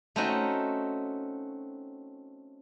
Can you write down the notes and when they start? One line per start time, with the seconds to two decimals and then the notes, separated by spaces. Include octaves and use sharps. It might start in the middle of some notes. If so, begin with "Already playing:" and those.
0.16 A3 C4 C#4 D#4 F#4 D#5